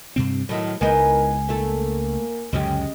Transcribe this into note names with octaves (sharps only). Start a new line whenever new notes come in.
G2 C3 C4
A2 D#3 F#3 E4
C#2 G#3 B3 D#4 E4 A#4 G#5
A3 A#3 E4 A4
C#2 F#2 D3 G#3 C#4 G4